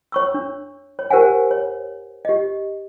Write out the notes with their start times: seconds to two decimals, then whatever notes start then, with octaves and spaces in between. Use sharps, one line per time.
0.12 C#5 C#6 E6
0.34 D4
0.99 C#5
1.10 G4 A#4 C5 E5 F#5 G#5
1.51 C#5
2.25 G4 D#5